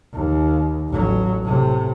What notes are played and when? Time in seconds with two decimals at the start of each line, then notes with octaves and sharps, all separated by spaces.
0.13 D#2
0.89 A1 F#3
1.45 A2 C3